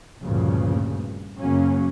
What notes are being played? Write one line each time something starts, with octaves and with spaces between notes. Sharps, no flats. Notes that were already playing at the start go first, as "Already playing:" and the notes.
D2 G2 A#2 C#3 F3
F#1 F#2 C#3 F#3 A#3 C#4